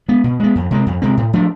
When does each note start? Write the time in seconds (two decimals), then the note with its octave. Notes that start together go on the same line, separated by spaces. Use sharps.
0.08 G#3 B3
0.24 B2
0.40 G#3 B3
0.55 F2
0.71 C3 G#3 C4
0.86 F2
1.02 C3 G#3 C4
1.17 A2
1.33 F3 A3 D4